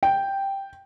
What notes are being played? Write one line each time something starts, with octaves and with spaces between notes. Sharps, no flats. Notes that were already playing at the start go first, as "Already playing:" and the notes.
G5